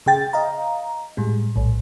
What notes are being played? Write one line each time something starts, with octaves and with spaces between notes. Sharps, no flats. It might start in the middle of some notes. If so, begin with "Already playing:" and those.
C#3 G#4 G5 A6
D#5 F5 A#5
A2 G3 G#3
A#1 A2